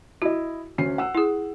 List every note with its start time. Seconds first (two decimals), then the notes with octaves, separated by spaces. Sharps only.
0.22 E4 F#4 D#5
0.78 D2 C#4 C7
0.98 F#5 E6
1.15 E4 G#4